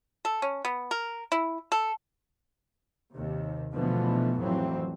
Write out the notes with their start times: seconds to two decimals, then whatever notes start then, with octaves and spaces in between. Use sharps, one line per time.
0.25 A4
0.42 C#4
0.65 B3
0.91 A#4
1.32 E4
1.72 A4
3.14 D#2 C3
3.73 B2 D3 E3 F3 A3 B3
4.37 A1 F2 E3 F#3 C4